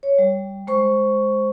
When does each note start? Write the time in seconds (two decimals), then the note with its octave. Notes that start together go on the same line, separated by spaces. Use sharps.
0.03 C#5
0.18 G3
0.67 G#3 C5 C#6